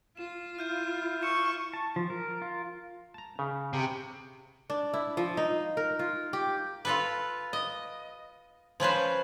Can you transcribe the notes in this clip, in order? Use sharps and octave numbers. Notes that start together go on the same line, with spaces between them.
F4 E7
E4 F6 G6 D#7
C#6 E6 C#7 E7
A5
F3
A#4
F4
A5 A#5
C#3
C3
D4
E4
F3
D#4
A#4
F4
G4
F4 A4 B4
D#5
F3 C#4 B4 C5